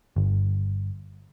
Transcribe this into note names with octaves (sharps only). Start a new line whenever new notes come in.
G1